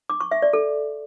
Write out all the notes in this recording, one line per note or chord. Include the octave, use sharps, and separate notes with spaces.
D6
C#6
E5
D5
A4